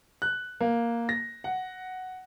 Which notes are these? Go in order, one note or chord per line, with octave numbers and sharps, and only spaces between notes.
F#6
A#3
A#6
F#5